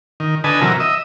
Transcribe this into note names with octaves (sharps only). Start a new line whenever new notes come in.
D#3
D3 B4 D#5 G#5 A5
C3 E3 F#3 A#4
D#5 E5